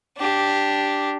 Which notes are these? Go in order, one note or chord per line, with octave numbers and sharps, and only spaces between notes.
D4 G4